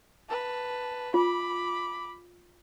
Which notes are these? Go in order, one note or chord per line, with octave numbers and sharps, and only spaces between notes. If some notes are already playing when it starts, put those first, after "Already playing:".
B4 A5
F4 B5 D6